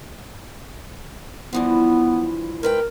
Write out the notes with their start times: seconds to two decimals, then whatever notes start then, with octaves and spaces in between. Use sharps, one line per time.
1.53 G2 E3 F3 B3
2.63 G#2 A#4 B4 G5